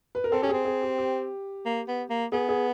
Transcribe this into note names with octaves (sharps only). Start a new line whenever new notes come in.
B4
A#4
C4 A4
C#4 G4
C4 G#4
G#4
G4
G4
A#3
B3
A#3
B3 G#4
G#4